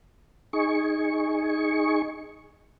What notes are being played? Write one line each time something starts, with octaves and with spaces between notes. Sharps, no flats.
D#4 G#4 C#6